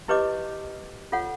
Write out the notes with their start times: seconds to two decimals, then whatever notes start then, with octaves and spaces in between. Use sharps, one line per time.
0.08 E4 G4 B4 C#5 D#5 D6
1.12 F4 A4 C#5 F#5